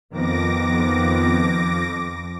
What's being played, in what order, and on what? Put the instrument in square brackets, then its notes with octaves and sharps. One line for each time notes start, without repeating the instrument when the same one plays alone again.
[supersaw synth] F2 D6 A#6 [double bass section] D#3 F3 B3